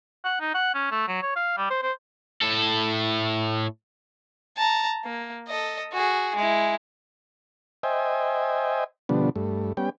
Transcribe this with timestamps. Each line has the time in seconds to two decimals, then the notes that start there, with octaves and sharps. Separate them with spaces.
0.24 F#5
0.40 D#4
0.54 F#5
0.74 C#4
0.91 A3
1.08 F#3
1.22 C#5
1.36 F5
1.57 G3
1.70 C5
1.82 C5
2.41 A2 A4
4.57 A5 A#5
5.05 A#3
5.48 A4 D#5
5.93 F#4 G#4
6.36 G#3 E4
7.83 C5 D#5 E5 G5 G#5
9.09 B2 D3 F3 G3 B3 D4
9.36 G2 A3
9.77 G3 B3 C#4 G5